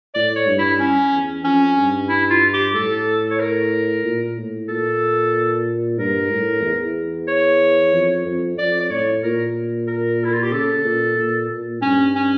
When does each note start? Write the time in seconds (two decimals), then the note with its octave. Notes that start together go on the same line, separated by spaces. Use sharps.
0.14 A2 D5
0.36 C#5
0.47 G2
0.58 E4
0.80 C#4
1.12 E2
1.44 F2 C#4
1.77 G2
2.09 E4
2.30 F4
2.53 G4
2.74 A2 A4
3.30 C#5
3.40 A#4
4.04 A#2
4.37 A2
4.68 A#2 A4
5.98 G2 A#4
6.31 A2
6.63 E2
7.28 C#5
7.92 F2
8.26 F2
8.58 F2 D5
8.80 D5
8.90 A2 C#5
9.23 A#2 A#4
9.87 A#4
10.24 E4
10.33 F4
10.43 G4
10.52 C#3 A4
10.85 A#2
11.17 A#2
11.50 A#2
11.82 G2 C#4
12.15 C#4